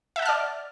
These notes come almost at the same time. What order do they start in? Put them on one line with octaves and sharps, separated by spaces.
E5 F#5 A5 F6 D5